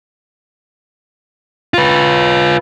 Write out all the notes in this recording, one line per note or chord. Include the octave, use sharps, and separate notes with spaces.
F4 B4